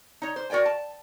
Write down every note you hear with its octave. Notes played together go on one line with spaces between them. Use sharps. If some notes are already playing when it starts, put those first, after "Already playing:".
D#4 C#5
C5
F#4 A#4 D5 G5 G#5
A5